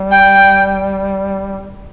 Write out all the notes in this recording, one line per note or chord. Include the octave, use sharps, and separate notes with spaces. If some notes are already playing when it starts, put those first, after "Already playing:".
Already playing: G3
G5